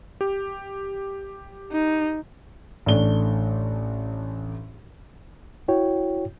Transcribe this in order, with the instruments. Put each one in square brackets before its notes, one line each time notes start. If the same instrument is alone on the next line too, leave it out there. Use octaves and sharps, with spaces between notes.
[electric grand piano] G4
[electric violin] D#4
[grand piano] A1 A3 D4 G7
[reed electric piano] E4 F#4 C#5 G5